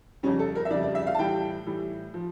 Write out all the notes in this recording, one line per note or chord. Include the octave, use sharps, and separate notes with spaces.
F2 C#3 G3 C#4
A4
A#4
E5
F2 C#3 G3 D5
D5
E5
F5
A5
A2 E3 G3 G5
A2 E3 G3
F3